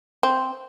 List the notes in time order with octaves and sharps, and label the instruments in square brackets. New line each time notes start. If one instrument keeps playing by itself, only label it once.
[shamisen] C4